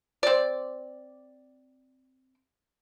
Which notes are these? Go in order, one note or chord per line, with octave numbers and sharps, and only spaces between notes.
C4 D5